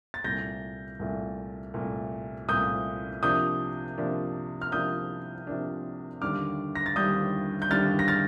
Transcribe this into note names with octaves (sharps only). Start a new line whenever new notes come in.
A6
C2 A#2 A3 G6 A#6
C2 A#2 A3
C2 A#2 A3
C2 A#2 A3 D#6 G6
C3 F3 A#3 D4 D#6 G6
C3 F3 A#3 D4
F6
C3 F3 A#3 D4 D#6 G6
C3 F3 A#3 D4
D#2 D3 G3 D4 D6 F6
A#6
A6
D#2 D3 G3 D4 D#6 G6
G6
D#2 D3 G3 D4 F6 A6
A#6
F6 A6